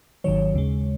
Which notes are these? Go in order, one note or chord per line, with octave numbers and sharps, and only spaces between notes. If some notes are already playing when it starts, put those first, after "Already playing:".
G#1 G#2 D#3 F#3 C#5
D#2 C#3 G#3